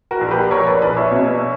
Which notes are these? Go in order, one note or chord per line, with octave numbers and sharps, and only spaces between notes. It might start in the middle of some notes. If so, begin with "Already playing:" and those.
F#4 A#4
A#1
G4 B4
A#1 A#4 C#5
B4 D5
A#1 B4 D5
C#5 E5
B2